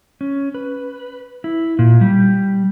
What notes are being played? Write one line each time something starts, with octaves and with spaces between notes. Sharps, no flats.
C#4
B4
E4
A#2
G3